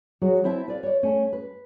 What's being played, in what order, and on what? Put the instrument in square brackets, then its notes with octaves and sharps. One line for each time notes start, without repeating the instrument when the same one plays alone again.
[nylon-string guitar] F#3 F#4 G#4
C4 E4 C5 E5 A5
B4 D5 F5
C#5 D5
A3 C#4
B4